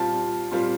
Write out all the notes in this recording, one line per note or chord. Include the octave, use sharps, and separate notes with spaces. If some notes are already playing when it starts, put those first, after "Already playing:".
Already playing: A#2 G3 C4 F4 A5
A#2 G3 C4 F4